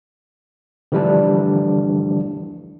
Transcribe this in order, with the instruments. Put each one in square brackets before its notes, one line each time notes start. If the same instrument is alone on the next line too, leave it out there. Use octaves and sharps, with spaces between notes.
[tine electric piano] D3 E3 F3 G3 A3 D4